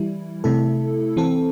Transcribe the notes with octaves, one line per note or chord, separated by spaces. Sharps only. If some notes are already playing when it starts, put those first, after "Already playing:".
Already playing: E3 G3 E4
C3 A3 E4 A4
E3 C4 A4